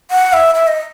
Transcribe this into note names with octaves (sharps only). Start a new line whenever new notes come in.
F#5
E5
E5
D#5